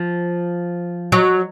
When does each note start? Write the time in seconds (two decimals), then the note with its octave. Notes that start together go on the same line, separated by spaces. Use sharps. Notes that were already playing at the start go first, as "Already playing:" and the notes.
Already playing: F3
1.12 F#3